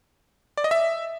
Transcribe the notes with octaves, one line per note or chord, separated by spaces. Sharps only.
D5
D#5
E5